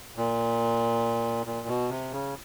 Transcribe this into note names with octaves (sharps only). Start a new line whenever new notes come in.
A#2
A#2
B2
C3
C#3